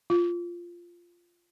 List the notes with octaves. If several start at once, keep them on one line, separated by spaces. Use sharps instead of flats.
F4